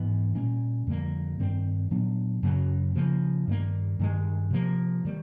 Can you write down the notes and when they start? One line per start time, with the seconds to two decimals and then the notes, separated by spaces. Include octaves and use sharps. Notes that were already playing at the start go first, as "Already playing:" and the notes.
Already playing: G#2 E3 G#3 B3
0.35 A#2 G3 A#3 C#4
0.87 F2 D3 G3 A#3
1.40 G2 D#3 G3 C4
1.91 A#2 F#3 B3 D4
2.43 F#2 C#3 F#3 A#3
2.95 C#3 F3 A#3
3.47 G2 D#3 G3 A#3
3.99 G2 D#3 G#3
4.51 C3 F3 A#3
5.05 D#3 G3